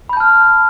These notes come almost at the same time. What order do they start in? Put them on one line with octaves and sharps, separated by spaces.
B5 G6 A5 F6